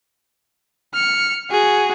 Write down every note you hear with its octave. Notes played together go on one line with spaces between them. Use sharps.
F6 C#7
F#4 G#4